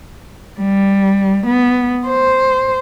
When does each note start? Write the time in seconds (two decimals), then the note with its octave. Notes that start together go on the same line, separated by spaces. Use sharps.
0.61 G3
1.47 B3
2.07 C5